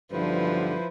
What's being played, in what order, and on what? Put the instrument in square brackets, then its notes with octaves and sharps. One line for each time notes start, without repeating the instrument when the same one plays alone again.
[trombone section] B1 G2 D3 [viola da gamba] F3 [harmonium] E4 B4 C5